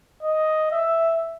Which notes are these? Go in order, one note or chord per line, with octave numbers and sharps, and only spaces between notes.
D#5
E5